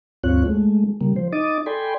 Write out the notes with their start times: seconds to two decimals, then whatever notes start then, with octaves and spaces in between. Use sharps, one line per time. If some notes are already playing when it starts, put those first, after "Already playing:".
0.24 D2 G2 C4 F4 C#5 F#6
0.45 G#3 A3
1.01 C#3 G3 A#3
1.16 F3 C5
1.32 D#4 D#5 D6 D#6 A6
1.66 A4 D5 G5 G#5 B5 C6